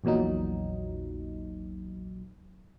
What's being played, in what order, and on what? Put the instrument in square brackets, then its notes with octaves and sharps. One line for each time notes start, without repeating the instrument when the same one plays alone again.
[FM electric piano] A#1 E2 A#2 F#3 D#4